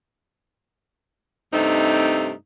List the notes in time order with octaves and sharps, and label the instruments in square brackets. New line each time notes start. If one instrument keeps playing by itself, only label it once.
[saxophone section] G2 C3 A3 C4 D#4